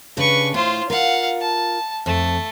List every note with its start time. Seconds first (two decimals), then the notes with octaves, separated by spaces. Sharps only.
0.17 C#3 D4 G4 B4 C#6
0.54 A2 F4 C5
0.90 F4 A#4 F5 F#5
1.41 A5
2.06 F2 A3